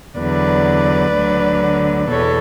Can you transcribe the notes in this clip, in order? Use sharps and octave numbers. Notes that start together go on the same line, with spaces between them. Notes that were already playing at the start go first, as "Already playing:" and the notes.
E2 D3 F#3 B4 D5
D2 D3 F#3
E2 B2 A4 C#5